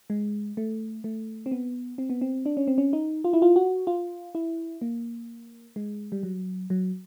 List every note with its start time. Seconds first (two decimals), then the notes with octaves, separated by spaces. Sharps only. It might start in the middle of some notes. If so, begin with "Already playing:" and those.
0.10 G#3
0.57 A3
1.04 A3
1.46 C4
1.51 B3
1.98 C4
2.10 B3
2.21 C4
2.46 D4
2.57 C#4
2.67 C4
2.78 C#4
2.93 D#4
3.24 F4
3.33 E4
3.42 F4
3.56 F#4
3.87 F4
4.35 E4
4.81 A#3
5.76 G#3
6.12 G3
6.23 F#3
6.70 F#3